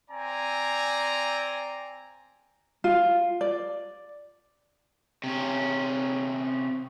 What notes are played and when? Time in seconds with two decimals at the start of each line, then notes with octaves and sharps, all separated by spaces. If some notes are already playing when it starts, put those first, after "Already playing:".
0.10 C4 D5 G#5 A#5
2.84 F4
3.41 D5
5.24 C3 C#4